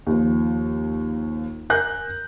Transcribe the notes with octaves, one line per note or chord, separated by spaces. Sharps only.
D#2 F3
A#4 G#5 F#6 G6